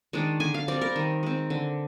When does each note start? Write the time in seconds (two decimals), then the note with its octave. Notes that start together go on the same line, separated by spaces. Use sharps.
0.13 D#3 G#3 D4
0.40 D3 G#5
0.54 F5
0.68 G3 C4 D5
0.81 A#4
0.96 D#3
1.23 G#3 C4
1.50 D3